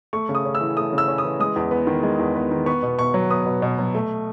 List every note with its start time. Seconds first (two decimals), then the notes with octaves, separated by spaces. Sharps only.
0.13 A3 C#6
0.29 C#3
0.35 D#6
0.45 C#4
0.55 E6
0.61 E3
0.77 A3 D#6
0.93 C#3
0.98 E6
1.08 C#4
1.18 D#6
1.25 E3
1.40 G#3 D#6
1.56 E2
1.71 B3
1.87 D#3
2.03 G#3
2.19 E2
2.35 B3
2.51 D#3
2.66 B3 C#6
2.83 B2
2.99 B2 C#6
3.14 F#3
3.30 B3 D#6
3.46 B2
3.62 B2
3.79 F#3
3.95 A3